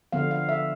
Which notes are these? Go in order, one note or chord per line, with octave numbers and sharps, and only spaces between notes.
D3 F3 B3 F5
F5
E5